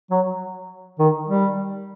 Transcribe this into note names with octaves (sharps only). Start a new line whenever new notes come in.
F#3
D#3
G3